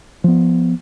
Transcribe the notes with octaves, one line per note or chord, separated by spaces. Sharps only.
F3 B3